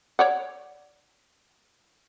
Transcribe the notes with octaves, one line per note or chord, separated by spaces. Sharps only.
C#5 D5 F#5